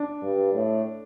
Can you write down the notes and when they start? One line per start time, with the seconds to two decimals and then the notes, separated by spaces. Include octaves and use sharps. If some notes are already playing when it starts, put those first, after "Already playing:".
Already playing: D4
0.22 G2
0.54 A2